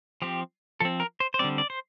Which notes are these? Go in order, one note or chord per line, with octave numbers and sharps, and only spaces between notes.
F3 C4 G4
F3 C4 A4
A#4
C5
C5
D3 G3 C4 D5
D5
C5